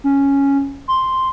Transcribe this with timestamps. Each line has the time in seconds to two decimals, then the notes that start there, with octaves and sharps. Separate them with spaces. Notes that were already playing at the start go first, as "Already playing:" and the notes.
0.04 C#4
0.88 C6